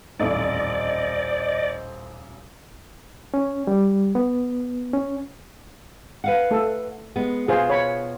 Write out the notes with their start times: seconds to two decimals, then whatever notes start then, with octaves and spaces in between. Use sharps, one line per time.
0.19 D#1 A1 F2 C5 D5 D#5
3.34 C#4
3.67 G3
4.15 B3
4.93 C#4
6.24 B4 F5 F#5
6.51 A3 A4
7.16 G#3 B3
7.48 B2 B3 F4 G#4 C5
7.70 C#5 B5